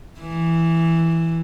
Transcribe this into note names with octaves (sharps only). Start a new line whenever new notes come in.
E3